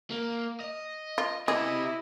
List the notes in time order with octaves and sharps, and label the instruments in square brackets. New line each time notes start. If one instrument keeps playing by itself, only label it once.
[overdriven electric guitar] A#3
D#5
[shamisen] F4
[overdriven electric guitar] C4 G4 [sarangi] E4 [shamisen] G#4 [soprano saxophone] D#5